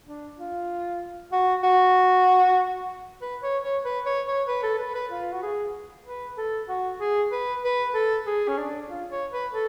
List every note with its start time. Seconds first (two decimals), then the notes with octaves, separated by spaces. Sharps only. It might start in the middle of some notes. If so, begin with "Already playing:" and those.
0.06 D4
0.38 F4
1.32 F#4
1.63 F#4
3.22 B4
3.43 C#5
3.63 C#5
3.85 B4
4.06 C#5
4.27 C#5
4.48 B4
4.63 A4
4.79 B4
4.95 B4
5.11 F4
5.32 F#4
5.42 G#4
6.06 B4
6.37 A4
6.69 F#4
7.00 G#4
7.32 B4
7.64 B4
7.94 A4
8.26 G#4
8.48 C#4
8.58 D4
8.89 F4
9.11 C#5
9.32 B4
9.53 A4